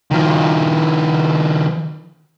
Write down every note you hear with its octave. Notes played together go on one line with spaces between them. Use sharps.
D#3 F3